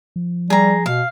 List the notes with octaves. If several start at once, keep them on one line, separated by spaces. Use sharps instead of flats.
F3
G3 G#4 A#5
B2 F5